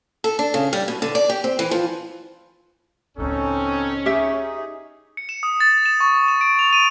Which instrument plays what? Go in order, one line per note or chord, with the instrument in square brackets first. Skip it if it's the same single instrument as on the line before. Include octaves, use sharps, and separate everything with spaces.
[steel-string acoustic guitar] A4
D4
C#3
G3
B2
D3
D5
G4
C4
E3
F3
[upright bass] C#2 A2 [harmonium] C4 D#4 A4 [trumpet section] C#4
[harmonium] D#4 G#4 [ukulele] G4 E5
[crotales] C#7
E7
D#6
A6
E7
C#6
C#6
E7
D7
F7
D#7